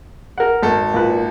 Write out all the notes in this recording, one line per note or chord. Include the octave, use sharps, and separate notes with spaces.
A#4 F#5
G#1 A4
A#2 B4